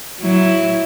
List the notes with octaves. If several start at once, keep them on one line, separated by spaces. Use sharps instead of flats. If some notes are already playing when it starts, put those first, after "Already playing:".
F#3 E4